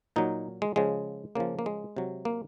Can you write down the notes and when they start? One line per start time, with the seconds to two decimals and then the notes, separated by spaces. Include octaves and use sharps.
0.16 A#2 F#3 D#4
0.62 G#3
0.76 C#3 F3 G#3
1.35 C#3 F3 A#3
1.59 A#3
1.66 G#3
1.97 C3 F#3
2.25 A#3